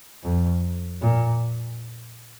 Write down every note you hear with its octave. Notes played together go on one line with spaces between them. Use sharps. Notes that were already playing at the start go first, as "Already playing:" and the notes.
F2
A#2